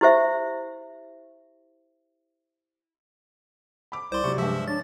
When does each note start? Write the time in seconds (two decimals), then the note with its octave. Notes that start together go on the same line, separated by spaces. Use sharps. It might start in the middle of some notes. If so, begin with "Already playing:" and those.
0.01 E4 G4 C5 E5
3.92 B5 D6
4.12 C2 C5 D5 C6
4.24 C3 F#3 C#6
4.38 G2 F3 G#3 E5
4.68 D4 C#5 A6